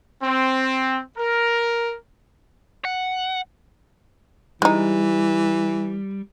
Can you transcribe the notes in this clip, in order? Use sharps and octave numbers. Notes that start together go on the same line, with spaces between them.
C4
A#4
F#5
E3 G3 G#3 D#4